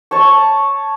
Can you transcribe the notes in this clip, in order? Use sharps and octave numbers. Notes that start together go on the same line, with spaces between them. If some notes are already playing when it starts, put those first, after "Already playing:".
C#5 A5 C#6